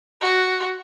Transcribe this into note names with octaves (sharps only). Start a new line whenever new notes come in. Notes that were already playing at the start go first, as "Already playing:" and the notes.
F#4